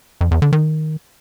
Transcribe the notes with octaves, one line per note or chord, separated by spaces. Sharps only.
F2
E2
D3
D#3